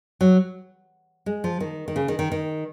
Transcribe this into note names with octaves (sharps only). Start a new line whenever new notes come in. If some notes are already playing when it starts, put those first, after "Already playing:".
F#3
G#3
F3
D#3
D#3
C#3
D#3
D#3
D#3